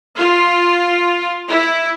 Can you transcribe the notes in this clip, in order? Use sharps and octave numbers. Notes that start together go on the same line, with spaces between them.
F4
E4